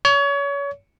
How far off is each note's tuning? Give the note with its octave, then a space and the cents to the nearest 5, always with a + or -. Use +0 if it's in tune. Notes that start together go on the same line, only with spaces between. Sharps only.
C#5 +30